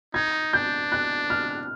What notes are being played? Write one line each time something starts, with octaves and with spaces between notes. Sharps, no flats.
D#4 G#6
D4 G6
F#6
F6